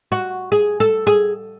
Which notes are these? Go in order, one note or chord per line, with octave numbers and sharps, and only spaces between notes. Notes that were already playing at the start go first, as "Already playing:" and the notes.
F#4
G#4
A4
G#4